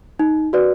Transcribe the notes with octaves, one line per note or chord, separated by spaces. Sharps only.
D#4
F#4 B4 D5